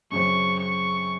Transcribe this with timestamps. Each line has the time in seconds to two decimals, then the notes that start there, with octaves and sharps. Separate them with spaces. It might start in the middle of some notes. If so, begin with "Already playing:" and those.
0.12 F#2 C#3 F#3 C4 C#6
0.59 C#6